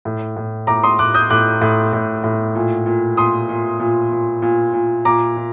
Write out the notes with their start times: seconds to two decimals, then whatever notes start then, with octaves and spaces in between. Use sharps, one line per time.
0.05 A2
0.36 A2
0.67 A2 A#5 D6
0.84 C6 D#6
0.99 A2 D6 F#6
1.14 D#6 G6
1.30 A2 D6 F#6
1.61 A2
1.93 A2
2.24 A2
2.55 A#2
2.86 A#2
3.17 A#2 C6 D#6
3.49 A#2
3.80 A#2
4.12 A#2
4.42 A#2
4.74 A#2
5.05 A#2 A#5 D6
5.37 A#2